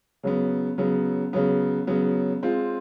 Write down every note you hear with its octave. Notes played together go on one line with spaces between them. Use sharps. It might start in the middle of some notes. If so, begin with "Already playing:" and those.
C#3 F#3 B3
C#3 F#3 B3
C#3 F#3 B3
C#3 F#3 B3
G#3 C4 F4